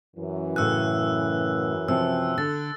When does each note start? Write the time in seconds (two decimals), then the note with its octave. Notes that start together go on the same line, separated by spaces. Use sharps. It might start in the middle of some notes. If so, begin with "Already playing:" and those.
0.17 F#2 E3
0.56 A2 C#3 E6 F#6
1.88 C3 F3 C4 E6
2.38 D3 A6